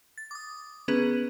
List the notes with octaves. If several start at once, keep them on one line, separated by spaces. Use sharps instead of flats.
A6
D6 D#6
D#3 B3 C#4 G#4 B4